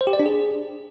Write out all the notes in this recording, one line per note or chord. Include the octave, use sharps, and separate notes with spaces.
C5
G4
D5
D4
G#4